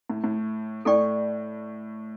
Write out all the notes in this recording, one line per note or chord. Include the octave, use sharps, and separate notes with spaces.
A2
A2
A2 A4 D5 G5 C#6